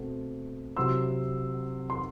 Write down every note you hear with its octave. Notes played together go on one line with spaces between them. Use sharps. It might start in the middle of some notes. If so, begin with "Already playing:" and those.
Already playing: B2 A3 C4
C3 F#3 C4 E4 C6 E6
C6